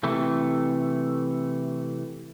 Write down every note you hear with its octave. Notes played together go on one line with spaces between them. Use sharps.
C3 E3 A3